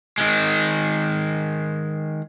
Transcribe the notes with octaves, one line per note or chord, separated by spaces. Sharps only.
D#3 G#3